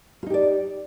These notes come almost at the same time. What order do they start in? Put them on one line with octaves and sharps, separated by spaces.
F4 D#4 G4 D5